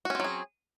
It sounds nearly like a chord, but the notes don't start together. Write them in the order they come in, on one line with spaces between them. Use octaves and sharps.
F#4 C#4 C4 F#3 G#4